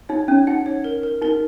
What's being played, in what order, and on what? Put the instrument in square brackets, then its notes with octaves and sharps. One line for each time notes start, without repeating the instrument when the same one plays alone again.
[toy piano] D#4 [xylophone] C#5
[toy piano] C#4 [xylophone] C#5
[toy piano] D#4 [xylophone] F#5
[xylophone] C#5
A#4
A#4
[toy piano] D#4 [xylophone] A#4